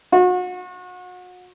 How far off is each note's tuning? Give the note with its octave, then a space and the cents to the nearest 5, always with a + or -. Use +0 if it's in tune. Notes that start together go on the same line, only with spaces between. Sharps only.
F#4 -35